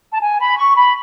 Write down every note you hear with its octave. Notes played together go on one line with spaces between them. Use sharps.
A5
G#5
B5
C#6
B5